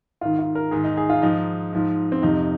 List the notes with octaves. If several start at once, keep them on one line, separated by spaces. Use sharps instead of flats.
G#2 D#3 F4
F4
A#4
G#2 D#3 G#4
D#4
G#4
F4
G#2 F3 D#4
G#2 F3
C4
F2 C3 F3 D#4